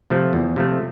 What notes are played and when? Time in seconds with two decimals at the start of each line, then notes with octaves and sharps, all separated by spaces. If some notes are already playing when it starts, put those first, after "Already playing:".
0.10 C3 F3 A3
0.33 E2
0.56 C3 F3 A3